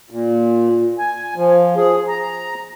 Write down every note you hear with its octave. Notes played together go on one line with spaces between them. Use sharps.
A#2
G#5
F3
G#4
A#5